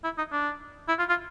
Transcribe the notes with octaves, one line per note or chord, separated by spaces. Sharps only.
E4
D#4
D4
E4
F4
F4